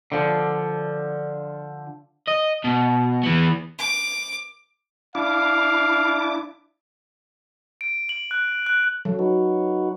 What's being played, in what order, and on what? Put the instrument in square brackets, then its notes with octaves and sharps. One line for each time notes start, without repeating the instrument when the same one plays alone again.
[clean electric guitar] D3 F3
[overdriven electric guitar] D#5
B2
E3 B3
[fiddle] D6
[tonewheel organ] D4 E4 D6 [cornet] F5
[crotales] D7
F#7
F#6
F#6
[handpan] F#3 [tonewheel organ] A4
[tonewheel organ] D#4 F#4 B4